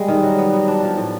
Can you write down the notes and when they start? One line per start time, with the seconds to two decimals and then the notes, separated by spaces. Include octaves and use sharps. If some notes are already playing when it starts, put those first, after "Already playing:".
Already playing: G3 G#3
0.08 D#3
0.23 F#3
0.38 B3
0.53 F#3
0.68 D4
0.83 F3
0.98 A2